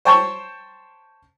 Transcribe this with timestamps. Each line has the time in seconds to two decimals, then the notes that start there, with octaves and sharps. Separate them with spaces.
0.05 C5 C#5 G5 A5 C6 C#6